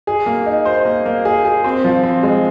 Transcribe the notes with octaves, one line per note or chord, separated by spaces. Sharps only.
G#4
A#3
D#4
C5
A#3
A#3
G#4
G#4
C4
F3
C4
G#3